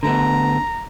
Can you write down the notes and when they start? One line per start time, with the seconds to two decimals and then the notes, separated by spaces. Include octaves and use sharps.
0.03 D3 A3 B3 A#5